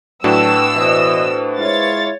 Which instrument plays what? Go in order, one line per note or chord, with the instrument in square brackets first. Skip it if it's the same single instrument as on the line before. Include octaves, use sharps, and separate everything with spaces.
[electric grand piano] A2 D4 F#4 [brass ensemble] F#3 [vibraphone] B4 G5 A5 [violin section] E6
[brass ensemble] B2 E3 D#5 [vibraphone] B4 C5
[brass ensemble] G#3 E4 F4 [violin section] C#5 A6